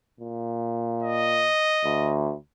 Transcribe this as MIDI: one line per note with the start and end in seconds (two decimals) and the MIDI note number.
0.20 1.50 46
1.02 2.17 75
1.85 2.34 38